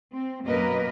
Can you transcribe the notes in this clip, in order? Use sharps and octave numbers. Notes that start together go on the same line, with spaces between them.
C4
F#2 B2 A#3 A#4 B4 D#5